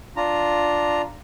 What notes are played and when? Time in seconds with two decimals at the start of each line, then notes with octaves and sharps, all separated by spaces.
0.16 D4 F4 A#5